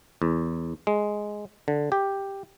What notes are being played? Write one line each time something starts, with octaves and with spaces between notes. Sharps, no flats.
E2
G#3
D3
G4